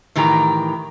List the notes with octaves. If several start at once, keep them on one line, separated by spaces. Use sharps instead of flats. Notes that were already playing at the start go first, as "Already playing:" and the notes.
A2 D#3 E3 G4 A#5